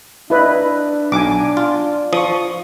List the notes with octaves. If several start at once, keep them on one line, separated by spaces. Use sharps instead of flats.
D4 E4 B4 D#5
B1 G#5 D6
F4
F3 C#6 D#6